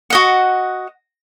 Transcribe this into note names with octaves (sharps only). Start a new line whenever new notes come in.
F#4 D#5 F#5